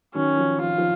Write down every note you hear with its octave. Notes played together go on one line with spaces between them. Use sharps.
D#3 F#3 C#4
F3
F3 F4
F3